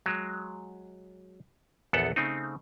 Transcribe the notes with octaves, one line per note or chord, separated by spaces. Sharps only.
F#3 G#3
A#1 E2 B3 A4 F#5
C#3 A3 C4 D#4